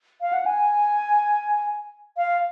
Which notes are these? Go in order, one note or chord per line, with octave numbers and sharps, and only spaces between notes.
F5
F#5
G#5
F5